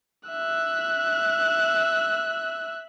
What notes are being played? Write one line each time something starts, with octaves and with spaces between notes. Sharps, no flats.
E5 F#6